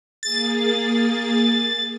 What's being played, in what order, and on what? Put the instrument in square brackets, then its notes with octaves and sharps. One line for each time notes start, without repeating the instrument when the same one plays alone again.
[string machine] A#3 G#4 [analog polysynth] A6